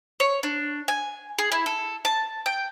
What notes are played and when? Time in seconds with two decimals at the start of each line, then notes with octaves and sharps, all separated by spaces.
0.20 C#5
0.43 D4
0.88 G#5
1.39 G#4
1.52 E4
1.66 A4
2.05 A5
2.46 G5